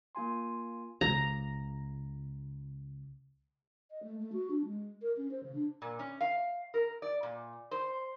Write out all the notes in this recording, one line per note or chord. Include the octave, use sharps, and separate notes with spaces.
A#3 F4 G#5 C6
C#2 A#5
D#5
A3
A3
F#4
D4
G#3
A#4
C#4
C5
C#3
D4
A#2
C#4
F5
A#4
D5
A#2
C5